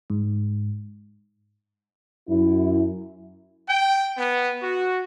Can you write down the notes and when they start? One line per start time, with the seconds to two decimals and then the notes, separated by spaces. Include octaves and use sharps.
0.10 G#2
2.28 F#2 E4
3.68 G5
4.18 B3
4.61 F#4